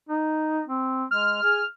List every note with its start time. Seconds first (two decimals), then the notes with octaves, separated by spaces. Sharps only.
0.09 D#4
0.67 C4
1.11 G#3 F6
1.42 G#4